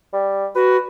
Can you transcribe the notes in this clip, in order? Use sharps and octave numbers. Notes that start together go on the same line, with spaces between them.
G3
F#4 B4